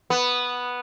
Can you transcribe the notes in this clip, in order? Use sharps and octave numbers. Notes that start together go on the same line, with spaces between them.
B3